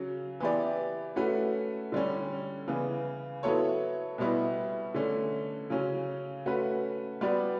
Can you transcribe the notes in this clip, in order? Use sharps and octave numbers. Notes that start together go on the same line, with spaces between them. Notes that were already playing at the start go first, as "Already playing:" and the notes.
Already playing: C#3 F#3 C#4
E3 B3 E4 G4 D5
A3 C#4 F#4 B4
D3 G3 C#4
C#3 E3 B3
F#3 B3 E4 A4 C#5
B2 G3 B3 E4
D3 A3 C#4
C#3 F#3 C#4
A3 C#4 F#4 B4
G3 B3 F#4 B4 D5